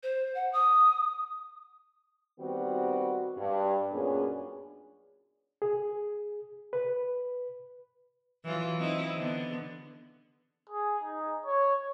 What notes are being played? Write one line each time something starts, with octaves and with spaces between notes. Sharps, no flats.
C5
F#5
D#6
D#3 G3 B3 C4 F#4
G2
F#2 A#2 B3 C#4 D4 G#4
G#4
B4
E3 F#3 F4
C4 D#4 E4
D3 B3
G#4
D#4
C#5